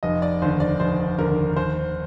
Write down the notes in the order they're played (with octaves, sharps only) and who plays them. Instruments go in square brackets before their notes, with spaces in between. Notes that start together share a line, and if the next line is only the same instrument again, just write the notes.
[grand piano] F1 D#5
D5
D#2 D3 C5
D5
F1 C5
D#2 D3 A#4
D#2 C5